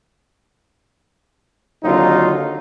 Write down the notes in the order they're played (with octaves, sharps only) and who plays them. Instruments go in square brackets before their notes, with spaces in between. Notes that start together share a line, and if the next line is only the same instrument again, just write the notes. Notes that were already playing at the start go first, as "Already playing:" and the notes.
[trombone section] D#2 D3 F#3 C4 D#4 F4